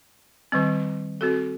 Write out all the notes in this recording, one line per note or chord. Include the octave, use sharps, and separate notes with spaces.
D#3 G3 C4
C4 F#4 A4